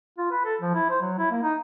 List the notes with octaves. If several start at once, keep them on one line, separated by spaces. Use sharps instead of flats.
F4
B4
A4
F3
E4
C5
F#3
E4
A#3
D#4